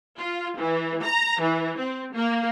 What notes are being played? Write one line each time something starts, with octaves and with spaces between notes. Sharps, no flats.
F4
E3
A#5
E3
C4
A#3